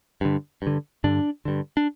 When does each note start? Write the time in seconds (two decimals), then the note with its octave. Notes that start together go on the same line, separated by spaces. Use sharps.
0.21 G2 D3
0.62 G2 D3
1.04 G2 D3 D4
1.45 G2 D3
1.77 D4